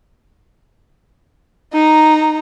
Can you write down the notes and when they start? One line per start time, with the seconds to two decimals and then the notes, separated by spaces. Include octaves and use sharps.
1.73 D#4 A#5